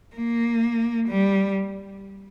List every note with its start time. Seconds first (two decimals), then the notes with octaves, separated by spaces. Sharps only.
0.16 A#3
1.08 G3